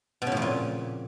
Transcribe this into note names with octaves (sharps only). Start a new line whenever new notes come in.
B2
C#3
A2
F2
A#2